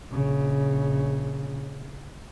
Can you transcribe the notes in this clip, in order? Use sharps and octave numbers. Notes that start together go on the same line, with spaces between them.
A#1 C#3